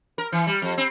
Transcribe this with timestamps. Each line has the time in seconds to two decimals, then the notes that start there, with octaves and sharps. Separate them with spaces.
0.18 A#4
0.32 E3
0.47 G3
0.62 F2
0.78 C4